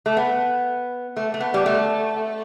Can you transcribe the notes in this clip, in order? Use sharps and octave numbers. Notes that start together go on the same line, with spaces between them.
A3
B3
A3
A3
B3
G3
A3